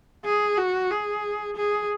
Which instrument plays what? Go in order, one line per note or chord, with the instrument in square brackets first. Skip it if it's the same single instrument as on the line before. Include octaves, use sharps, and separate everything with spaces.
[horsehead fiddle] G#4
F#4
G#4
G#4